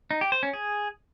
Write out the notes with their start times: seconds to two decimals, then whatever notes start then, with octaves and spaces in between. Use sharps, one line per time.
0.11 D#4
0.21 G4
0.32 C5
0.43 C#4
0.53 G#4